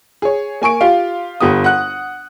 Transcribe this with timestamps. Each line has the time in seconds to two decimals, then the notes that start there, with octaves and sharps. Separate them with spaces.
0.22 G#4 C#5
0.61 A#3 G#5 C#6 D7
0.81 F4 G4 F5
1.40 G1 B3 G4 D#6
1.64 F#5 F#6